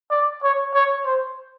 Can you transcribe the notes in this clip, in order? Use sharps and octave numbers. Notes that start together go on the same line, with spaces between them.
D5
C#5
C#5
C5